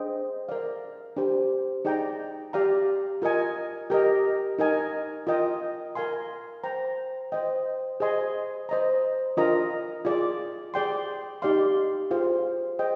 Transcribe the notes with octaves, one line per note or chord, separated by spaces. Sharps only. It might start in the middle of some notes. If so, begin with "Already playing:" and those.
Already playing: D4 G#4 C5 D#5 G5
A#4 D5 F5
D4 G4 C5
D#4 G#4 D5 G5 A#5
G4 D5 F5 A#5
F4 A#4 D#5 G#5
G4 A#4 D#5
D#4 A#4 D#5 G#5
F4 A#4 D#5 G5
A#4 F5 G#5 C6
C5 G5 A#5
C5 D#5 G5
G#4 C5 D#5 G#5 C6
C5 D#5 A#5
D4 F4 A#4 D#5 A#5
F4 G#4 D5
G#4 D5 G5 C6
D#4 G4 D5 F5 C6
F4 G#4 C5 F5
G#4 C5 D#5 G5